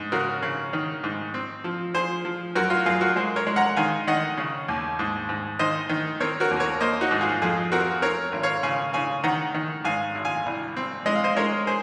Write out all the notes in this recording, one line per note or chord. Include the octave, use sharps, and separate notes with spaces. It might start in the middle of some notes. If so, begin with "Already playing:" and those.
Already playing: G#2
C#3 F#4 A#4
C#3
D#3
G#2
C4
F3
F3 G#4 C5
F3
F#2 F#4 A#4
F4
F#2 F4 G#4
F#4 A#4
G#3 G#4 C5
A#4 C#5
G#3
F#5 A#5
D#3 F5 G#5
D#3 D#5 F#5
C#3
D#2
G#2
G#2
D#3 C5 D#5
D#3
C4 A#4 C#5
F#4 A#4
D#2
A#4 C#5
A#3 C5 D#5
D#4 F#4
G#2
F4 G#4
F2 F4 G#4
C4 F#4 A#4
C4 A#4 C#5
G#1
C#5 F5
C#3 F5 G#5
C#3 F5 G#5
D#3 F#5 A#5
D#3
G#2 F5 G#5
G#1
F5 G#5
C2
C4
G#3 D#5
F5
C5 D#5
G#3 A#4 C#5
G#4 C5